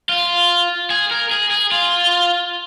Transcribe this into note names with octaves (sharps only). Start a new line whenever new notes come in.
F4
G#4
A#4
G#4
G#4
F4